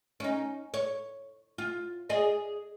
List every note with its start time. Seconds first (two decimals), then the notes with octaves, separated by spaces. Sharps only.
0.20 C#4 D#4
0.74 C#5
1.58 F4
2.09 G#4 D5 D#5